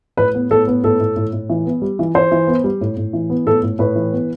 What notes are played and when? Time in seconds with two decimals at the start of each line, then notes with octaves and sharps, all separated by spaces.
0.17 A2 B4
0.35 B3
0.50 A2 A4
0.67 B3
0.84 A2 A4
1.00 A2
1.16 A2
1.33 A2
1.50 E3
1.66 B3
1.82 G3
1.99 E3
2.15 E3 C5
2.32 E3
2.48 B3
2.64 G3
2.81 A2
2.97 A2
3.13 E3
3.30 B3
3.46 A2 A4
3.63 A2
3.79 A2 B4
3.96 E3
4.13 B3